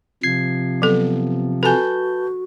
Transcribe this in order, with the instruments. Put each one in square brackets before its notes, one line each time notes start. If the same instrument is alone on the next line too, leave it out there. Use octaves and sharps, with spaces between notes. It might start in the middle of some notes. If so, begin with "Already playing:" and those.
[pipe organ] C3 F3 [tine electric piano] G#6 C7
[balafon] F#3 A4 [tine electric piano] B3
[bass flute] F#4 [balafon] A4 G#5 [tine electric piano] B4 A5 G6